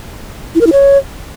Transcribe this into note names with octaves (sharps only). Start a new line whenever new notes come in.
E4
A#4
E4
C#5